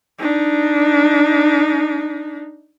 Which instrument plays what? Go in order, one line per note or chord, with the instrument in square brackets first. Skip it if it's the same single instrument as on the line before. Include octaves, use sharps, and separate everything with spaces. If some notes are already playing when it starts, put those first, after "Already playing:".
[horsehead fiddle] D4 D#4